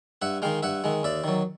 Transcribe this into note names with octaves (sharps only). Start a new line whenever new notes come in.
G2 E5 F#5
D#3 G#3 F5 G5
G2 E5 F#5
D#3 G#3
D#2 D5 E5
D#3 F#3